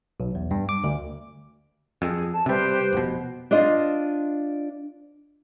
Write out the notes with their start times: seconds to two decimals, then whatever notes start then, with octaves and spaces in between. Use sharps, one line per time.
0.20 B1
0.35 E2
0.51 G2
0.69 D6
0.84 D2
2.02 F2 G#4
2.31 A5
2.46 C3 G3 G4 B4 C5
2.93 F1 B2
3.51 D4 F4 C5 D#5